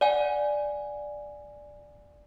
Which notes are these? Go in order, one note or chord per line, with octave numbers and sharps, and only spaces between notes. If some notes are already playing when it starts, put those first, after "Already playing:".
D5 F#5 G#5